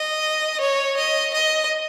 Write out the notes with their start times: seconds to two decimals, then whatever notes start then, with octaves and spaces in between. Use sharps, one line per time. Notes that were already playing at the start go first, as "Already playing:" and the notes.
Already playing: D#5
0.61 C#5
0.97 D#5
1.34 D#5